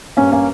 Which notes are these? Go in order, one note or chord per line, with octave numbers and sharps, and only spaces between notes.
G2 A#3 C#4
A#3 C#4